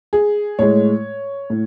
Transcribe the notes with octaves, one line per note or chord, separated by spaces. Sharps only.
G#4
A2 G#3 C#5
A2